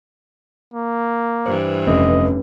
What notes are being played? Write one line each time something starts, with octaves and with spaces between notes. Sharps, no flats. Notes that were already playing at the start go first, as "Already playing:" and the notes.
A#3
G2 E3 C5
F1 C#4 B4 D#5